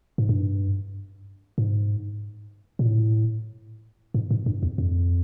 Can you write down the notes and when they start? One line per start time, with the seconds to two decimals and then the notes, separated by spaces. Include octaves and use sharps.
0.18 G#2
0.29 G2
1.58 G#2
2.79 A#2
2.86 A2
4.14 G#2
4.31 G#2
4.46 G2
4.63 E2
4.78 F2